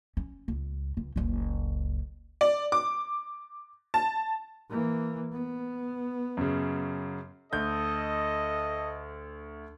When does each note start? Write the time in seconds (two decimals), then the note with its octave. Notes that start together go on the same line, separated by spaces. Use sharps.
0.17 C#4
0.48 C#2
0.97 C#2
1.16 F#1 C#2
2.41 D5
2.72 D6
3.94 A5
4.70 E3 A#3
5.32 B3
6.37 F#2 C#3
7.53 D2 A4 D#5 G6